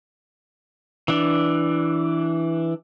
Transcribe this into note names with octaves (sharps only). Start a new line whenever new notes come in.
E3 D4